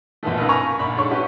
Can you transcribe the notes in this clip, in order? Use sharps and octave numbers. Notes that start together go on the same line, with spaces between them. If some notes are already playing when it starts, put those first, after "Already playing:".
A#1 B2 D3 E3 F3 A3
C#2 D#4 A#4 B4 E6
G#5 A#5 B5 C#6
A#1 D3 D4 B5
G#2 G#3 D4 A4 C#5 C#6
C#4 E4 F#4 G4 B4